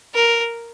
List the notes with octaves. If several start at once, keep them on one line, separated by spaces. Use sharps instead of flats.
A#4